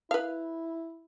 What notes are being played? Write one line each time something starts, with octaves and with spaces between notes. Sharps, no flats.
E4 B4 F5